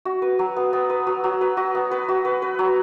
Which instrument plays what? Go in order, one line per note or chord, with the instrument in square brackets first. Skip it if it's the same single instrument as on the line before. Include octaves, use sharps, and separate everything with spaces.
[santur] F#4
B4
F#3
B3
B3
B4
F#3
F#3
B4
F#4
B3
B4
F#4
B4
B4
F#3